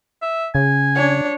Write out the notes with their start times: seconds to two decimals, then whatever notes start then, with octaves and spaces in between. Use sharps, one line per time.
0.22 E5
0.55 C#3 G#5
0.95 D4 C#5